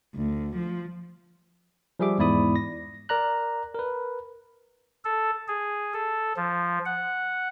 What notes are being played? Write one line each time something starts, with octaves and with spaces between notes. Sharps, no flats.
D2
F3
F3 G3 G#4 E5 D6
E2 G#2 E4 D5 B5 D#6
A#6
A#4 D5 A#5 F#6
A#4 B4
A4
G#4
A4
F3
F#5